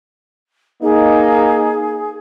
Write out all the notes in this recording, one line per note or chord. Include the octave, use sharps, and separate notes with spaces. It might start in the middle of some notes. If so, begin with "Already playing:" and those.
A#3 D#4 G#4